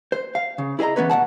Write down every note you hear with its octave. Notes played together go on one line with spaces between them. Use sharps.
C5
F5
C#3
E4 G#4 B4 D#5 A#5
E3 B3 C#4 B4 C#5
B2 F#3 F#5 A5